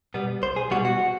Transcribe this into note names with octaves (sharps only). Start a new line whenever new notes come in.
B2 G3 B3
B1 C5
G#4
B2 G3 B3 F#4
F#4